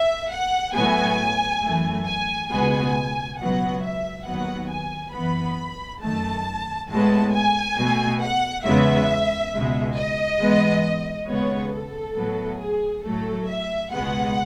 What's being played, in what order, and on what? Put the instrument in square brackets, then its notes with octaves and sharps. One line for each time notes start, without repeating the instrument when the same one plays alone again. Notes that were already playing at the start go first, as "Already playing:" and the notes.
Already playing: [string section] E5
F#5
A2 F#3 B3 G#5
F#2 E3 A3
G#5
C#2 B2 G#3 B3 G#5
C#2 B2 F#3 B3 F#5
E5
D#2 D#3 F#3 B3 F#5
G#5
F#2 E3 B3 B5
F#2 D#3 A3 A5
A2 G#3 B3 A5
G#5
B2 A3
F#5
E2 C#3 G#3 B3 E5
C#2 B2 G#3
D#5
G#2 E3 G#3 B3
D#2 C#3 G#3 B3 C#5
A4
A2 F#3 B3
G#4
A2 F#3 A3 A4
E5
C#2 B2 G#3 B3 F#5